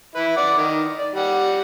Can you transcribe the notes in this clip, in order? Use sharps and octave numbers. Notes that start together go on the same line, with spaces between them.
E4 B4
D5 F#5 D6
D#3
D5
G3 F#5